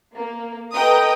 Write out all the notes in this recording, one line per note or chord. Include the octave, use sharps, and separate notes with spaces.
A#3
A4 B4 D#5 G5 A#5 D#6